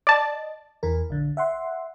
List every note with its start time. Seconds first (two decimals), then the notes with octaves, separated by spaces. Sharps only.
0.07 D5 D#5 A5
0.83 E2 E3 A#4
1.10 A#1 D3
1.37 E5 F#5 C6